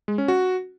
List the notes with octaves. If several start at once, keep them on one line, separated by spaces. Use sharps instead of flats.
G#3
C#4
F#4